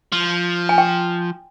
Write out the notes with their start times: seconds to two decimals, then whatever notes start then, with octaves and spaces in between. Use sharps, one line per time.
0.12 F3
0.69 G#5
0.78 G5